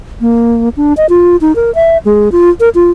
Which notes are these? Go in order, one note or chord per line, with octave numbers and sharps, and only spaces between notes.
A#3
D4
D#5
F4
D#4
A#4
E5
G#3
F4
A#4
F4